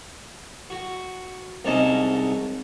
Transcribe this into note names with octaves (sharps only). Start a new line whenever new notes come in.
F#4
C2 G#2 C#4 G#4 D#5 A5